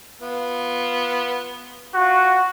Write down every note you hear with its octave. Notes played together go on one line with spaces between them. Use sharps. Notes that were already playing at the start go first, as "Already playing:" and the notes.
B3 F4
F4 F#4